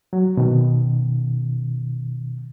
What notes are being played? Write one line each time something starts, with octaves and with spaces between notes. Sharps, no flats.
F#3
B2 D#3